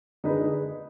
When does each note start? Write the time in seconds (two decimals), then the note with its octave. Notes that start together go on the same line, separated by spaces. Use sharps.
0.24 D3 G#3 D#4 G#4 B4